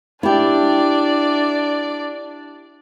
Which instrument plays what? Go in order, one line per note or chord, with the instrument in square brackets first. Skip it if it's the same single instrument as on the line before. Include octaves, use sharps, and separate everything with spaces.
[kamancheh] D4 D5 [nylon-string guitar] E4 G4